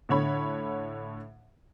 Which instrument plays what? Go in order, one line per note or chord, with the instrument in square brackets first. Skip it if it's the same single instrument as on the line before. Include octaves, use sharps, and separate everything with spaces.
[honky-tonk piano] A2 D3 C#5 B5